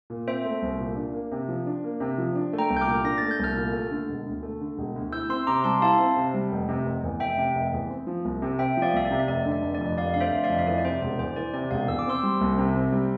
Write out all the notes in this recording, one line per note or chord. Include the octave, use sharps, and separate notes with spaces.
A#2
C4 C5 E5
A3
C2
A#2
D4
A#3
C3
F3
D4
A#3
C3
F3
D4
A3
G5 A#5
C2
G6
D6 F6
A#2
D4 A#6
A3 A6
G6
C2 F6 A6
A#2
A3
D3
E1
D2
A3
D3
E1
D2
E4 E6 G6
C4 C6 E6
C3 A#5 D6
G3 A5 C6
E4 F5 A5
C4
C3
G3
F1
C3
F1
E2
F1 E5 G5
C3
F1
E2
C4
F3
C2
C3
C4 E5 G5
F3
D5 F5
C2 E5
D5
C3
E5
F1 D5
D3
D5
F1
D5
F2
F1 D5 F5
D3 F5
C5 E5
F1
D5 F5
F2
E5
E3 D5
D5
C3 C5
E1 D5
E2 C5
E3 D5
C3 D5
E1 D5 F5
E2 E6
D6
C4 C6 E6
G3
C2
C3
C4
G3